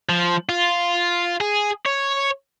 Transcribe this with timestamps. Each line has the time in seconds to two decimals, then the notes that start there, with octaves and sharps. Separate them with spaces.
0.09 F3
0.49 F4
1.41 G#4
1.86 C#5